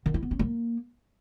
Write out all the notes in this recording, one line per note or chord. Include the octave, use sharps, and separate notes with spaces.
D#3
E4
B3
C#4
A#3